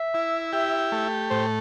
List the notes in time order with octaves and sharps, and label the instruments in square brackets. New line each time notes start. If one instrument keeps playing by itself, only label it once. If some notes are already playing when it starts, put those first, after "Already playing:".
Already playing: [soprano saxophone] E5
[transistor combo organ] E4
G4
A3
[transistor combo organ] A2 [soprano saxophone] C5